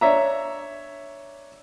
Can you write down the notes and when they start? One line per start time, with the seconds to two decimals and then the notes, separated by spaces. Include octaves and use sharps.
0.01 D4 C#5 E5 A#5